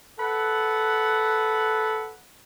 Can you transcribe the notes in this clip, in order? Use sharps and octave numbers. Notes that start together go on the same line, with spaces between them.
A4 B4 F#5